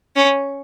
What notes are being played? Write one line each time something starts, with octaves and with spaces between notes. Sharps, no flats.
C#4